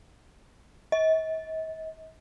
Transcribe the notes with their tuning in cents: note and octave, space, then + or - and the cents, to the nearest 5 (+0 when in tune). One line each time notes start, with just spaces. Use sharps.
D#5 +45